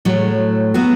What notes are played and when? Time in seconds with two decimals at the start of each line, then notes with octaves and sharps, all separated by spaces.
0.05 A2 F#3 A3
0.74 F#3 B3 F#4